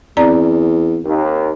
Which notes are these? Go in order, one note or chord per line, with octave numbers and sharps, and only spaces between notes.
E2 C4 D5 A#5
D#2